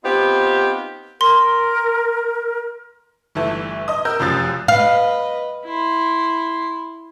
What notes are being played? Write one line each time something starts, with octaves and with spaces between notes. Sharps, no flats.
B3 C4 D#4 F4 G4 C5
A#4 C6
G1 E3 A3
D#5 D#6
A#4 E6 G6
F1 F#2 F3 F#6 A6
B4 D#5 F5
E4 C6